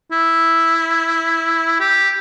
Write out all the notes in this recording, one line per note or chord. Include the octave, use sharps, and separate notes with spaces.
E4
G4